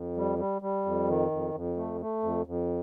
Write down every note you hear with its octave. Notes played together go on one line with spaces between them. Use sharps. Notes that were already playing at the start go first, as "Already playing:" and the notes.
Already playing: F2
G3
G3
G3
F2
D#3
F2
F2
A3
A3
F2
F2